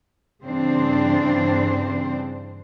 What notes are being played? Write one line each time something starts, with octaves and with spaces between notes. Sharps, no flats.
G2 C#3 E3 C4 D4 C5